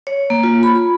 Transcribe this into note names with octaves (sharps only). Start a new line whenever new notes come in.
C#5
A#3
F4
B5